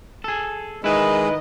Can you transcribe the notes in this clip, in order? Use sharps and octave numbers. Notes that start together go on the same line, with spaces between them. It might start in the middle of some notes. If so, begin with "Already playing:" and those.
G#4 A4
D#3 G#3 E4 B4 D#5